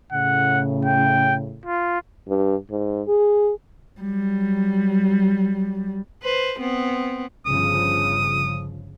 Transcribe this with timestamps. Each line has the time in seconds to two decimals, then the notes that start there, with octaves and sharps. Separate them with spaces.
0.12 A2 C#3 F#5
0.85 G5
1.66 F4
2.29 G2
2.71 G#2
3.08 G#4
4.00 F#3 G3
6.22 B4 C5
6.59 B3 C4
7.46 G1 C#3 F3 D#6